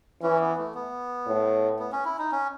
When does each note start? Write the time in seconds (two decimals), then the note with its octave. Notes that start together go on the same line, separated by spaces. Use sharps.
0.22 E3 C#4
0.40 B3
0.58 A3
0.75 B3
1.27 A2
1.79 B3
1.92 C#4
2.05 E4
2.19 D#4
2.32 C#4